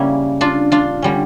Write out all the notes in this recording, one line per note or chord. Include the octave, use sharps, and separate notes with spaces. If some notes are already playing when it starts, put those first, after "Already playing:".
Already playing: C#3 G3 A#3 C#4 E4
D4 F4
D4 F4
D3 G3 C#4